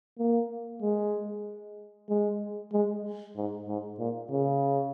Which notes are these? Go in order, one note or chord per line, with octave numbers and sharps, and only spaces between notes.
A#3
G#3
G#3
G#3
G#2
G#2
A#2
C#3